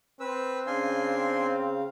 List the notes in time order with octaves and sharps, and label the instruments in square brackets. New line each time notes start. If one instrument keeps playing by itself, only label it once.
[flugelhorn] C4 [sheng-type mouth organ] B4 E6
[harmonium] C#3 F5 [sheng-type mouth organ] D4 G#5 C6